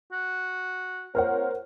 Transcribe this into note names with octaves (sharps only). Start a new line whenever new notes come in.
F#4
C4 F4 A#4 C5 C#5 F#5